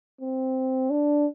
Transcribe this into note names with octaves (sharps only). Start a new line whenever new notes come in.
C4
D4